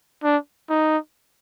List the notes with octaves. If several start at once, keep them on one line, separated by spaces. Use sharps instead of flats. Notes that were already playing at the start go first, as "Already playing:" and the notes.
D4
D#4